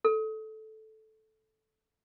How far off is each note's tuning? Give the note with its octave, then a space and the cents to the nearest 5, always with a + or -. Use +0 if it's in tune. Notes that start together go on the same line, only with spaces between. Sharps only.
A4 -10